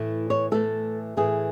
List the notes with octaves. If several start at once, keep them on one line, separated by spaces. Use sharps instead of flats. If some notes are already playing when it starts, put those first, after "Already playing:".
Already playing: A2 E3 A3
C#5
A2 E3 A3 A4
A2 E3 A3 G#4